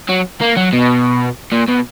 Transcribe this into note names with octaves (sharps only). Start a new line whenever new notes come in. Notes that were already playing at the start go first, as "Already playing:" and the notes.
F#3
A#3
F#3
B2
A#2
B2